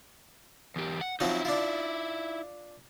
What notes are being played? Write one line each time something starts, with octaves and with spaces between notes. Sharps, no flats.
E2 G4
F#5
F3 F#3 C4 D#4 E4
D4 F4